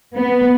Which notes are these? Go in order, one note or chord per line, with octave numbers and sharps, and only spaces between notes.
B3